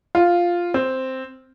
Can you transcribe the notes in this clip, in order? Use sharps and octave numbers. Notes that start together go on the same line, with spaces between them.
F4
C4